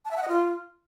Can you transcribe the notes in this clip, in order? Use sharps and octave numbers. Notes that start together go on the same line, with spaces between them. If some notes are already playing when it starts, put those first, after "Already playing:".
A5
E5
F#5
D#5
F4